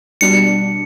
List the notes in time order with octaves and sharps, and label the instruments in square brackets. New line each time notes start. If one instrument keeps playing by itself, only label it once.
[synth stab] B2 G3 D4 [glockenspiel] C#7